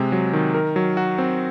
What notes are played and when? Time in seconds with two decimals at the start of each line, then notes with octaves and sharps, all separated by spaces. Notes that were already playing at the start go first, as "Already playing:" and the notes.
Already playing: C3 G#3 C4
0.12 F#3
0.33 D#3
0.54 A#4
0.76 F#3
0.97 F#4
1.18 C4